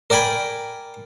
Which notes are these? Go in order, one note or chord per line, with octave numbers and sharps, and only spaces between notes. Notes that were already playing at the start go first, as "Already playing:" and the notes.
A#4 D5 G5 G#5 B5